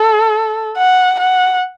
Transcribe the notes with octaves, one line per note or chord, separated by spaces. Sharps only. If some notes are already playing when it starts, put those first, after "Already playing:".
Already playing: A4
F#5
F#5